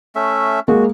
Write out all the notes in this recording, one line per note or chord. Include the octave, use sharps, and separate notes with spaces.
A3 C#4 E5
G#3 A#3 F#4